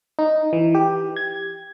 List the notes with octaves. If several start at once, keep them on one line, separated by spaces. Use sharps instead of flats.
D#4
E3
G4
G#6